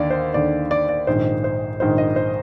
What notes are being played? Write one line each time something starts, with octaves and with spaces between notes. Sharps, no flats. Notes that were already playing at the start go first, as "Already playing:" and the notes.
Already playing: D#2 D3 D5 F5
C5
D#2 D3 D5
D5
D5
A#1 G#2 D#3 C5
C5
A#1 G#2 D#3 C5
D#5
C5